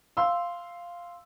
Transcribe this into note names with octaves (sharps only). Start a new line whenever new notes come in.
F5 C6 E6